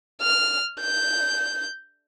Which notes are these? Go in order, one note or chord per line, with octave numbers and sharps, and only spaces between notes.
F6
G6